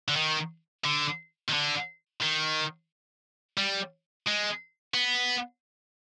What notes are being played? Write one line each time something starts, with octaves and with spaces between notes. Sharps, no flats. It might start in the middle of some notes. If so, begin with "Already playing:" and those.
D3
D#3
D3
D#3
D3
D#3
G3
G#3
B3